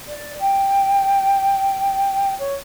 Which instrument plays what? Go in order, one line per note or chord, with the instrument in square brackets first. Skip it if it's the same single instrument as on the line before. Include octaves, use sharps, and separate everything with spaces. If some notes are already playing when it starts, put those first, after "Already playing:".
[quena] D5
G5
C#5